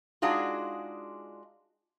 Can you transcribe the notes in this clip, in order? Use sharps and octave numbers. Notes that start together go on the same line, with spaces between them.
G#3 D4 D#4 F4 F#4 G#4